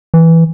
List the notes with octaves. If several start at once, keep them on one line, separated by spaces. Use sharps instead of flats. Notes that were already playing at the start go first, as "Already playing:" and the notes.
E3